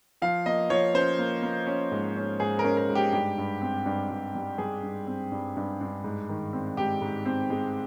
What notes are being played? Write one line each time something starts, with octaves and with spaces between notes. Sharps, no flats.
F3 F5
A#3 D#5
F3 C#5
C#4 C5
A#3
A#3
C#4
G#2
C#4
G#2 G#4
A#4
C#4
A#4
G#2
G4
G2 G4
G2
C4
G2
G2
G3
G3 G#4
G2
C4
G2
G2
G2
G#2
D#3
C4
G#2 G4
G#2
C4
G#3